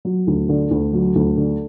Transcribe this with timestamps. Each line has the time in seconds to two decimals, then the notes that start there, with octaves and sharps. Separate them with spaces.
0.05 F#3
0.27 D2
0.49 D3
0.71 D2
0.93 F#3
1.15 D2
1.37 D3